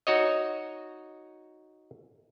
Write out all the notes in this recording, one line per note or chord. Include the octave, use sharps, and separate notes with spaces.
D#4 F#4 C#5 D#5